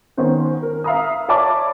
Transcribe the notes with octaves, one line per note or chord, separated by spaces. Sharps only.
D#3 B3 C#4 C5
A#4
E5 F5 A#5 D#6
C#5 D5 E5 A5 B5 D6